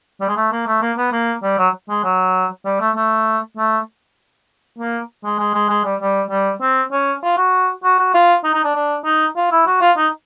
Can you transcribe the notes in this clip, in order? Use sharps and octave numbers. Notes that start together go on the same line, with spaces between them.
G3
G#3
A3
A#3
A3
A#3
B3
A#3
G3
F#3
G#3
F#3
G3
A3
A3
A3
A#3
G#3
G#3
G#3
G#3
G3
G3
G3
C4
C#4
F4
F#4
F#4
F#4
F4
D#4
D#4
D4
D4
D#4
F4
E4
F#4
F4
D#4